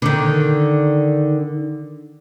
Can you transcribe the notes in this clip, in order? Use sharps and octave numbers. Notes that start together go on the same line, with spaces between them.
D3 D#3